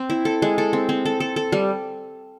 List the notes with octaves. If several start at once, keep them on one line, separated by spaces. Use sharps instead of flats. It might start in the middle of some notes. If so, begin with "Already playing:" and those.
Already playing: C4
E4
A4
G#3
A4
C4
C4
A4
A4
A4
G3